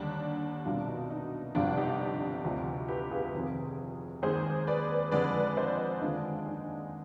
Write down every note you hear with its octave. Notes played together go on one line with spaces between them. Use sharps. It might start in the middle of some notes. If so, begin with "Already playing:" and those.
Already playing: D#2 D3 G3 D4
C2 B2 G3 D4 F4
D#4
D#4
G1 F2 C3 G3 D4 F4
D#4 G4
D2 C3 F3
G4 B4
F4 G#4
F1 F2 C3 D#3
D#2 D#3 G#3 G#4 C5
B4 D5
F2 D3 G#3 B4 D5
C5 D#5
D#2 D3 G#3 D4 F4
D#4